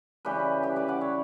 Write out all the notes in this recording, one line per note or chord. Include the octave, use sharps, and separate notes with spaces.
C#3 E3 G3 G4 B4
G4 B4
B4 D5
D5 F#5
C#5 E5